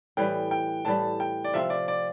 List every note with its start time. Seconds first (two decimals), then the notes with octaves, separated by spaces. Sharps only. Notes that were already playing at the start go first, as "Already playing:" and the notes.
0.17 A2 E3 G3 G5
0.51 G5
0.85 A2 E3 G3 A5
1.20 G5
1.44 D5
1.53 C3 F3 C4 E5
1.70 D5
1.88 D5